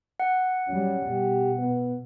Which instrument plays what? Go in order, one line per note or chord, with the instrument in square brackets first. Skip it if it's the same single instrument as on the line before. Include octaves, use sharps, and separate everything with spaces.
[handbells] F#5
[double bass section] F#3 G3 [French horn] C#4
[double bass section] B2 [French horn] G4
[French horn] B3